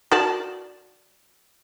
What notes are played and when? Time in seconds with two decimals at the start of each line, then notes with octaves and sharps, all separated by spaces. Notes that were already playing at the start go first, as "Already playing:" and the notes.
0.12 F#4 D5 A5